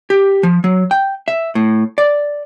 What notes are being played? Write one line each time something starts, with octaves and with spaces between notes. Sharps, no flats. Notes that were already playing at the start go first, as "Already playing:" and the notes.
G4
F3
F#3
G5
E5
A2
D5